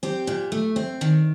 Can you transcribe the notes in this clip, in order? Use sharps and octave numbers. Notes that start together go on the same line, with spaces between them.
C4 G4
A#2
A3
C4
D#3